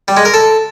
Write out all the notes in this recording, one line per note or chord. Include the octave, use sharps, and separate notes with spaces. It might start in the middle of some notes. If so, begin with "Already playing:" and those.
G3
G#3
A#4
A4